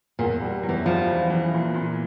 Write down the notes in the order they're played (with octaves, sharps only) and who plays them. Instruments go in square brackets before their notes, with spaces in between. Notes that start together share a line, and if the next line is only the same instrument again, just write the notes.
[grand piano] E2 [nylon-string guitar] A#2
[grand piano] G3
E2
[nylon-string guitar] E3
[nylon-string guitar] F3 [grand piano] G3
[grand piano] E3
E3
A#2
A#2